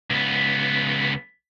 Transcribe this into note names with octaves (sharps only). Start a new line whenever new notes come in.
C#2 B3